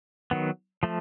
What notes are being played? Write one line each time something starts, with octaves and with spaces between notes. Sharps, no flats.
D#3 F#3 B3
F3 A3